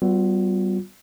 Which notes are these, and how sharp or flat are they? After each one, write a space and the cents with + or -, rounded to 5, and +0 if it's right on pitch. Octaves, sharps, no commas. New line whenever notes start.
G3 -30 B3 +20 F4 +30